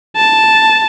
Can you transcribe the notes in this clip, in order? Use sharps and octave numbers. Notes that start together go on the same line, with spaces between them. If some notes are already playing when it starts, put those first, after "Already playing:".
A5